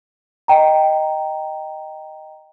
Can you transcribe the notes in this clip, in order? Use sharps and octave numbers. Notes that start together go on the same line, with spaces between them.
D#5 G5 A#5